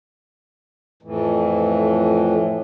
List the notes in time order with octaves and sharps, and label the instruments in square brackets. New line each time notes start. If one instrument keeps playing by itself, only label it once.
[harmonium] F2 A2 E3